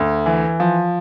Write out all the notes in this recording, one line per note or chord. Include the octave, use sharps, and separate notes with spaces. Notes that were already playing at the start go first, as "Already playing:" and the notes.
Already playing: D2
E3
F3